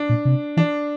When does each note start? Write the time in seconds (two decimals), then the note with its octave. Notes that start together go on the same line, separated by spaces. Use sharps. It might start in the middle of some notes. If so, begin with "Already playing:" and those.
Already playing: D4
0.09 A#2
0.25 C3
0.57 E3 D4